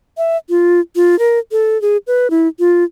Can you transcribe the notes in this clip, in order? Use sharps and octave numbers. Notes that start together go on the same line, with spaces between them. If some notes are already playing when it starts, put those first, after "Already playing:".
E5
F4
F4
A#4
A4
G#4
B4
E4
F4